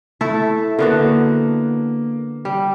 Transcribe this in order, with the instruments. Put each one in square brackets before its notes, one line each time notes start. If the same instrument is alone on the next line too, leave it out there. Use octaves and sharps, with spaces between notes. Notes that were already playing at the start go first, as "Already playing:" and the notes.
[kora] A3 E4 A4
[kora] D3 B3 F#4 [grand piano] A#3
[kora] G3